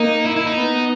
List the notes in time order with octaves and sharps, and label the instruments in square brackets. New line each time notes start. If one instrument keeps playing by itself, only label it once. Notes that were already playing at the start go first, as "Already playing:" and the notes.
Already playing: [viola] A#3 [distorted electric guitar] D#4
[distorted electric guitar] E4
E4
D#4
[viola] B3